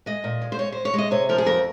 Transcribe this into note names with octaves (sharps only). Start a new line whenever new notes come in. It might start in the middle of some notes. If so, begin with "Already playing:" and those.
G#3 D#5
A#2
G#3
C5
G#3 C#5
C5
G#3
C#5
G#3 D#5
C3 C#5
F3 A#4
G#4
F2 A#4